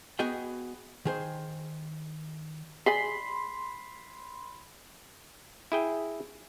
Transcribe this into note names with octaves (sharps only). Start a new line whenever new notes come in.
B3 F#4 G#4 D#5 G5
D#3 G#4 C5
G#4 D5 G#5 B5 C6
E4 G#4 G5